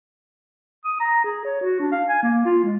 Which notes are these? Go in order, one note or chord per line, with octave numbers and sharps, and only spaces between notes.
D#6
A#5
G#4
C#5
F#4
D4
F5
G#5
A#3
F4
G#3